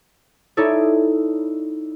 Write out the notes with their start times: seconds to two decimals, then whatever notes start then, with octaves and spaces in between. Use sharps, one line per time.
0.57 D#4 E4 A4 C#5 D5